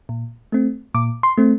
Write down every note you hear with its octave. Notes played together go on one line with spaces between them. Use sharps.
A#2
A3 C4
A#2 D6
C6
A3 C4